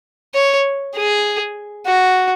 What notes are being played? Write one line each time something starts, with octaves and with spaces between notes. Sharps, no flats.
C#5
G#4
F#4